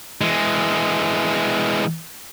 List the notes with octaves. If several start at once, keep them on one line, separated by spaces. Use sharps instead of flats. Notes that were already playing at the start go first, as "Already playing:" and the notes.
E3 G#3